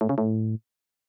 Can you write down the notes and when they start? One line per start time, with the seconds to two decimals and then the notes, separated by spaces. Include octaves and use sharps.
0.01 A2
0.09 C#3
0.18 A2